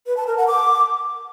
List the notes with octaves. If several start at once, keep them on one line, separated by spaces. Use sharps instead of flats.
B4
A5
A#4
F#5
D6